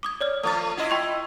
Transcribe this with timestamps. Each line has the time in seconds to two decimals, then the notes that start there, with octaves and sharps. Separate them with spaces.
0.03 D6 D#6 G#6
0.21 C#5 D5 F6
0.43 F3 A3 D#6 A6
0.77 E4 F4 D#5
0.90 G5 C6 C#6